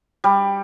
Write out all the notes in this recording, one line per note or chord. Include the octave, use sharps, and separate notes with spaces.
G3